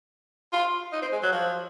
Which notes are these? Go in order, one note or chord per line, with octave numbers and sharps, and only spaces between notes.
F4
D#4
C4
G#3
F#3
F3